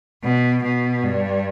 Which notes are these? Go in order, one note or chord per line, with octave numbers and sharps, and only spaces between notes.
B2
B2
G2